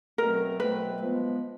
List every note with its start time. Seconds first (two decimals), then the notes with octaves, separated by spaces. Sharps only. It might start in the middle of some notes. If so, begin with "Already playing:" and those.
0.18 B2 F#3 A3 C4 A#4
0.60 B2 F#3 A3 C4 B4
1.02 F3 G#3 B3